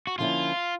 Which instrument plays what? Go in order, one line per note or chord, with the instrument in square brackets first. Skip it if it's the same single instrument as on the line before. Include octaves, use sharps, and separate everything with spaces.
[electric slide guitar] F#4
[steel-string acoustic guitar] D3 F3 A#3 C#4 E4 [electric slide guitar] F4